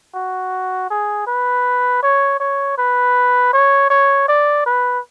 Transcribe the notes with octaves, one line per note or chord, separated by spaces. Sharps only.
F#4
G#4
B4
C#5
C#5
B4
C#5
C#5
D5
B4